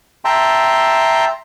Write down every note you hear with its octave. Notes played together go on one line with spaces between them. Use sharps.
E5 G5 A5 A#5 C6